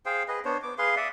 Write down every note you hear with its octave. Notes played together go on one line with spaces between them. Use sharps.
G#4 C5 F5 G5
G#4 B4 D#5
B3 D4 C5 C#5
B3 D6
G#4 B4 F5 C6
D5 E5 F#5 D#6